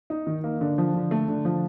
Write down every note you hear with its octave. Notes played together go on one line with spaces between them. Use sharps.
D#4
D#3
A#3
D3
F3
D3
A3
D3
F3